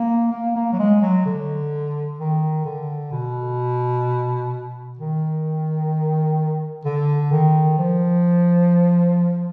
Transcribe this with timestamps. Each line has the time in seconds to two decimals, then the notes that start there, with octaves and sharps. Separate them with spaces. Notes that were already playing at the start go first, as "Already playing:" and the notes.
Already playing: A#3
0.32 A#3
0.56 A#3
0.73 F#3
0.79 G#3
1.02 F#3
1.26 D3
2.19 D#3
2.65 D3
3.12 B2
4.99 D#3
6.85 D3
7.32 D#3
7.78 F3